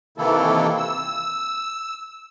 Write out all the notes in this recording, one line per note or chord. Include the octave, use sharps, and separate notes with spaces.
C3 D#3 E3 A#3 E4 A4
E6